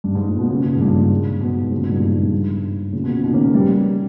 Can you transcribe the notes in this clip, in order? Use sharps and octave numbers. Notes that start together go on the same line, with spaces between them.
G2
G#2
A#2
B2
A#2 C#3
G#2
G2 A#2
G#2 B2
A#2 C#3
G#2 B2
G2 A#2
G#2
G2 A#2
A#2 C#3
B2
A#2 C#3
B2 D#3
A#3 C#4
G#3 B3
G3 A#3